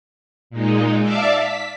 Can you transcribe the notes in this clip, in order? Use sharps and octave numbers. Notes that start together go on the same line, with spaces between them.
A#2 G#3 D#4
D5 E5 F5 A5 D6 E6
B6